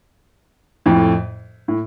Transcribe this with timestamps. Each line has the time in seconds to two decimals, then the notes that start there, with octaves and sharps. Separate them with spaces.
0.86 F2 A2
1.68 A2